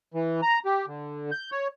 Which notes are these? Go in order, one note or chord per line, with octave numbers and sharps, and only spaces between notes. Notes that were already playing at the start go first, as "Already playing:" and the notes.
E3
A#5
G4
D3
G6
C#5